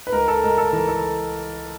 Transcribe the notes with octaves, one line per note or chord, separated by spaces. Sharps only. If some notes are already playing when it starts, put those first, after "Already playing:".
B4
C#2 A#4
A4
C#2 A#4
A4
E3 A#4
A4